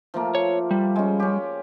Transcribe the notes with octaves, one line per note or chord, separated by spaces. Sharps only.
F3 A3 A#3
C#5
G3
G#3 C#4
C#4 G4